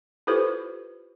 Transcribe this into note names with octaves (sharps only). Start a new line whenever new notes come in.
E4 F4 G4 A4 B4 C5